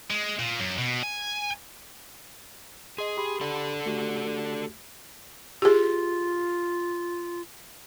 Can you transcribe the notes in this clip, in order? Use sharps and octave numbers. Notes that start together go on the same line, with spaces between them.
G#3
A#2
F#2
B2
G#5
G#4 D#5 C6
G4 B5 C6
D4 A4
A3 F#4 G4
F4 G4 G#4